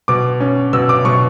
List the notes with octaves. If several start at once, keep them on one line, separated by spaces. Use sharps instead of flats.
B2 D6
C#4
B2 E6
D6
B2 C#6